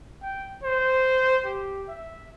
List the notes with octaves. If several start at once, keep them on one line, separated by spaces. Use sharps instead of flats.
G5
C5
G4
E5